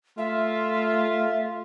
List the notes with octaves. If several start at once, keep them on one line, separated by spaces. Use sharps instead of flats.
A3 F4 E5